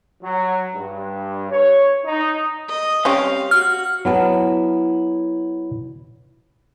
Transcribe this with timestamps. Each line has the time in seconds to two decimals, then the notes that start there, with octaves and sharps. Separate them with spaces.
0.23 F#3
0.74 G2
1.50 C#5
2.05 D#4
2.68 D#5
3.05 G3 C4 C#4 F5
3.51 F#4 F6
4.05 F#3 B3 E4 G#5 A5